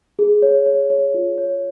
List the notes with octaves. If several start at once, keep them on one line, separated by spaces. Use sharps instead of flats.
G#4
C#5
C#5
C#5
F4
C#5